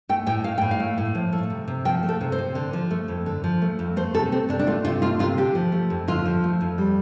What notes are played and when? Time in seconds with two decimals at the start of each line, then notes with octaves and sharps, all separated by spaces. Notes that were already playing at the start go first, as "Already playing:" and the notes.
0.09 A3 G5
0.26 A2 G5
0.44 A3 F5
0.58 A2 G5
0.71 F5
0.80 A3
0.98 A2
1.15 F3
1.33 A3
1.50 C3
1.68 C3
1.85 F3 G5
2.03 A3
2.09 A4
2.21 C3
2.32 C5
2.38 C3
2.55 D3
2.73 F3
2.91 A3
3.08 F2
3.26 D3
3.44 F3
3.62 A3
3.79 F2
3.96 A3 C5
4.14 C3 A4
4.32 A3 C4
4.49 C3 D4
4.59 D4
4.67 A3 F4
4.84 C3 F4
5.02 A3 F4
5.19 C3 F4
5.37 D3 G4
5.55 F3
5.72 A3
5.90 F2
6.08 D3 F4
6.25 F3
6.44 A3
6.61 F2
6.78 G3